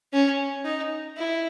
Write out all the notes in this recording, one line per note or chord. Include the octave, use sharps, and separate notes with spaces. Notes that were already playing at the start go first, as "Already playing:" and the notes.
C#4
D#4
E4